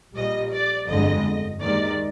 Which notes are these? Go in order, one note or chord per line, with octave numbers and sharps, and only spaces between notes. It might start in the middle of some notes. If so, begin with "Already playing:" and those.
A#1 A#2 G3 D#5
D5
G1 F2 D3 G#3 D#5
D#2 D#3 G#3 D5